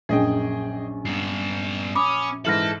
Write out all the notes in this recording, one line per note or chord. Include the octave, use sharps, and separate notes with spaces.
A#1 F#2 G#4 D#5 G5
G2 B3 C7
C#4 B5 D6 D#6
G#2 E3 A4 E5 F6 A#6 F#7